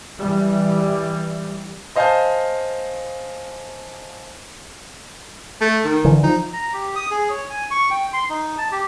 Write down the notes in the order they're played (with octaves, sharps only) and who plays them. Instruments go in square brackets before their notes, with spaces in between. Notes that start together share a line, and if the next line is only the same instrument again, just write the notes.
[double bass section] E3 G3
[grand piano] C5 D#5 F5 G#5 A5 G6
[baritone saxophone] A3
D#3
[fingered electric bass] D3 E3
[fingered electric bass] F3 [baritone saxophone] D#4
[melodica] A#5
G4
D#6
G#4
C#5
G#5
C#6
G5
C6
D#4
A5
G4